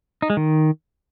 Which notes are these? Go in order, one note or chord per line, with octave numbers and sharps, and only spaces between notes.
D#4
G#3
D#3